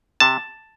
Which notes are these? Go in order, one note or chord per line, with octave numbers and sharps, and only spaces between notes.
C3 A5